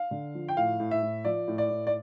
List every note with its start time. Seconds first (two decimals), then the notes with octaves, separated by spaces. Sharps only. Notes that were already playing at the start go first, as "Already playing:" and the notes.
Already playing: F5
0.11 D3
0.35 F3
0.48 G5
0.57 A2 F5
0.80 A2
0.91 E5
1.02 A2
1.25 F3 D5
1.48 A2
1.58 D5
1.70 A2
1.87 D5